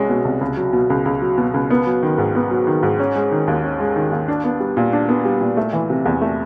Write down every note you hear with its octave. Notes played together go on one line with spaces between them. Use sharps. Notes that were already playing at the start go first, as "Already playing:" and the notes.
Already playing: C2 G#3 C#4
B2
C2
C#2
F#3
B2
C#2
C#2
F#3
B2
C#2
B3
F#3
D#3
G#2
B3
F#3
D#3
G#2
C#4
G#3
D#3
D#2
C#4
G#3
D#3
D#2
D4
B3
G3
A#2
D4
B3
G3
A#2
A3
E3
C3
E2
A3